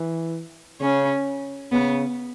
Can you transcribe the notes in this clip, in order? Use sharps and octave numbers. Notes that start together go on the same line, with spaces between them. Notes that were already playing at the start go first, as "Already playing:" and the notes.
Already playing: E3
C#3 C#4
C#3 B3